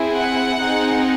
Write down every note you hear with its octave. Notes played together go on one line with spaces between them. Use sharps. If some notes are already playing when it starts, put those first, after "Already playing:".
Already playing: C4 E4 G#4
F#5
C4 D#4 G#4